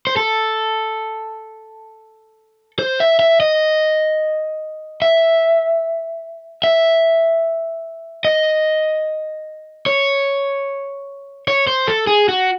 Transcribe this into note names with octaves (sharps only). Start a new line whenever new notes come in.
C5
A4
C5
E5
E5
D#5
E5
E5
D#5
C#5
C#5
C5
A4
G#4
F#4